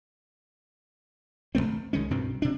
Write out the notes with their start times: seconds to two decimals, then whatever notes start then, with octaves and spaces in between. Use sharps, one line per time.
1.55 G#1 F2 A3 C4
1.93 C2 D#3 G#3 C#4
2.11 C2 G2 B2 C4
2.42 C3 D4